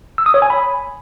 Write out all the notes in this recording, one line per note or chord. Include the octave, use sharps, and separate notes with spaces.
E6
D#6
C#5
G#5
B5